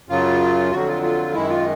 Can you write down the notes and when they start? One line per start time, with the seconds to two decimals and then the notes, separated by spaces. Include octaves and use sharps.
0.09 F#2 C#3 F#3 F4
0.71 F2 D3 F#3 F#4
0.87 F4
1.03 F4
1.34 F#2 D#3 G#3 E4
1.49 F4